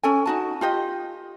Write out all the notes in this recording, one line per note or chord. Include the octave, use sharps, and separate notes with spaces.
C#4 A4 G#5
D#4 F#4 A5
F4 G4 D#5